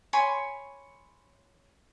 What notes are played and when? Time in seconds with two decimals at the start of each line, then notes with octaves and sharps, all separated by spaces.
0.13 C#5 G#5 B5 C6